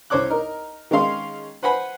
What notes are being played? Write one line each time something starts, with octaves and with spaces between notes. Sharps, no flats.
C2 C#4 C5 C#5 D6 F#6
D#4 A#4
D#3 G#3 C#4 F5 C6
B4 C5 F#5 G#5 B5